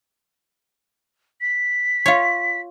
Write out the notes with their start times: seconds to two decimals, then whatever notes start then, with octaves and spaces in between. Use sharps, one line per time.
1.41 B6
2.06 F4 C#5